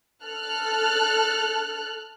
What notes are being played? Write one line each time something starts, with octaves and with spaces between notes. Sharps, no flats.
A4 F6 F#6